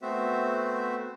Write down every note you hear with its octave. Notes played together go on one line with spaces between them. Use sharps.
A3 B3 C4 F#4 C5 E5